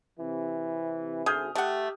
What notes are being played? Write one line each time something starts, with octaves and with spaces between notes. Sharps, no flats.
C3 E3
G#1 D2 G#4 D#6 F6 G6
A3 G4 F#5